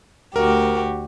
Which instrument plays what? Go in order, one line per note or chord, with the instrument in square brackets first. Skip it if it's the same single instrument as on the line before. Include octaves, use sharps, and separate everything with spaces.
[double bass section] D2 [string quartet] F#4 G4 [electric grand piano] A#4